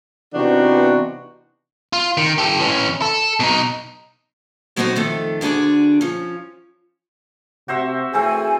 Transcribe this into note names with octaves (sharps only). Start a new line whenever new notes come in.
C3 E3 B3 D4 D#4 F#4
F4
D#3
G4 A4
E3 C#4
A4
B2 D#4
A2 F#3 C4 D#4 F#4 C5
F2 D#3 A3 A4
D2 D3 D4 G#4 D5
F3 C#4
C3 F#4 C5 E5
E3 A3 C4 G#4 G#5